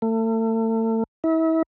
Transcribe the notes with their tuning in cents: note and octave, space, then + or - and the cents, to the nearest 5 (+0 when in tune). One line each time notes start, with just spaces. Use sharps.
A3 +35
E4 -35